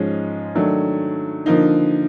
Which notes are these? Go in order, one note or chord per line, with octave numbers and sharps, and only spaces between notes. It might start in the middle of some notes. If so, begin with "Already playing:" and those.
Already playing: G#2 F3 G#3 C#4
D#3 F#3 A3 D4
D3 F3 A#3 D#4